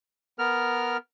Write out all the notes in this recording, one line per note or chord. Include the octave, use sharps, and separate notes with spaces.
B3 A#4 F6